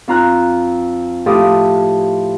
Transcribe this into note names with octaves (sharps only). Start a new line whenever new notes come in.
F2 F4 A#5 F#6
A2 F3 G4 A5 D#6 E6